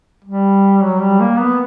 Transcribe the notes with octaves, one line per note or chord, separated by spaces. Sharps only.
G3
F#3
G3
A#3
B3